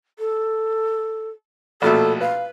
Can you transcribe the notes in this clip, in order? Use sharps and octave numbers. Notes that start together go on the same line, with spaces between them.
A4
A#1 B2 A3 A4
B4 F5